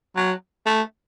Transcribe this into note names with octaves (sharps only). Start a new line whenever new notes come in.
F#3
A3